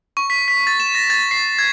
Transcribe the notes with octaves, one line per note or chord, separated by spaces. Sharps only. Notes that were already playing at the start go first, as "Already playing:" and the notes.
C#6
B6
B6
A6
E7
A#6
A6
C7
G#6